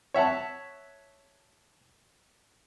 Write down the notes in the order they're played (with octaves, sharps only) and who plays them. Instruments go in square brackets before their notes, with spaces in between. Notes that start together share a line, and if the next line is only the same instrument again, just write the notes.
[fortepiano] C#5 E5 F#5 A5